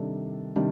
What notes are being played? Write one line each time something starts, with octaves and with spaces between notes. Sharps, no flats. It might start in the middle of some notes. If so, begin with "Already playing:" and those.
Already playing: C3 D#3 G3 D4 A4
C3 D#3 G3 D4